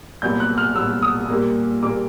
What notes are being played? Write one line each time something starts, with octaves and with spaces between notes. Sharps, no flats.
C2 A#2 F#3 B3 G6
F#6
F6
C2 A#2 F#3 B3 E6
D#6
A#2 G3 A#3
A#2 G3 A#3 D6